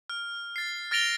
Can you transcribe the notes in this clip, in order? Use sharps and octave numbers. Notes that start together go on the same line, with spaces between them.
F6
A6 C7
F6 A6 A#6 D7 F7 G7